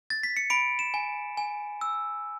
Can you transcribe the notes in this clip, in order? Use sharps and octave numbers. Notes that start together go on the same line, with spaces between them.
A6
B6
C#7
B5 D7
E7
G#5
G#5
E6